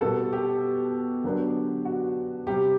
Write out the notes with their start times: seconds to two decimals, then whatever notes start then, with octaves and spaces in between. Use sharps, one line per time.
0.01 B2 G3 B3 A4
0.32 G4
1.24 D3 F#3 B3 D4
1.85 F#4
2.47 C3 G3 C4 G4